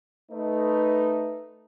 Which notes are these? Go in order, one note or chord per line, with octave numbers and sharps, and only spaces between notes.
A3 D#4 B4